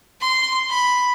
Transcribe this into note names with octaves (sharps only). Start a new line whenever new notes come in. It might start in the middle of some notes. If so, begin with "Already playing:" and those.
C6
B5